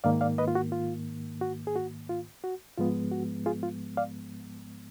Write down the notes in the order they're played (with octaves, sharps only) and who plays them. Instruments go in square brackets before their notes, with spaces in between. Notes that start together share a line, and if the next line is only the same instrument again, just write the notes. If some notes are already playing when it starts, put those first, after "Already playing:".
[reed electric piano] G#2 D#3 A#3 D5 F5
D5 F5
B4 D#5
F4
F#4
F4
F#4
G#4
F#4
F4
F#4
G#2 F3 G#3 B3 F4
F#4
F4 G#4
F4
D5 F5